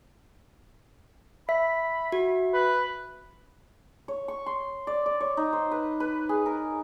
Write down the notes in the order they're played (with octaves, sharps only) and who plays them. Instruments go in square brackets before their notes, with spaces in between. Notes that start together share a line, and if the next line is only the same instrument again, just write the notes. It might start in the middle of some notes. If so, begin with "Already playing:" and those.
[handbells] E5 [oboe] B5 [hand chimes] B6
[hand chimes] F#4
[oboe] B4
[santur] C#5
C#6
C6
D5
D5
C#5
D#4
C5
B4
B4
G#4
A#4